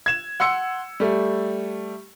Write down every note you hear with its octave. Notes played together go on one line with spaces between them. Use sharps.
G#6 E7
F#5 C6 E6 C#7
G3 A3